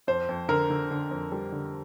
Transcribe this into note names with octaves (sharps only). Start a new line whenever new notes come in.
F2 C5
F2
D3 A#4
D3
D3
F2
G3
D3